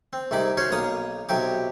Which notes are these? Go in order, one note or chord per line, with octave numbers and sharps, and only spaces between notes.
C4
C2 G#2 C3 D#4 B5 D6
C#4 F#4 G#4 C5 C#5
B1 A#3 C#5 A#5 D#6
B1 C3 F#3 G4 D6